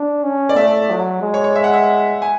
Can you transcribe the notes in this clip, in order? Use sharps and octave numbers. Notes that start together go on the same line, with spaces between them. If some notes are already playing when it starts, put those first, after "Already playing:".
Already playing: D4
C#4
D5
A3 E5
F#3
G#3
C#5
C#5
E5
F#5
E5
G#5